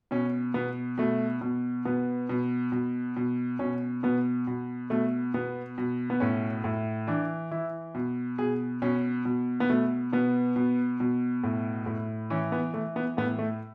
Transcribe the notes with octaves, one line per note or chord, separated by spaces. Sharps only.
B2 C#4
B2 B3
B2 A3
B2
B2 B3
B2
B2
B2
B2 C#4
B2 B3
B2
B2 A3
B2 B3
B2
B3
A2 C#4
A2
E3 D4
E3 E4
B2
B2 G#4
B2 C#4
B2
B3
B2 A3
B2 B3
B2
B2
A2
A2
E3 C#4
B3
E3 A3
B3
A2 B3
A3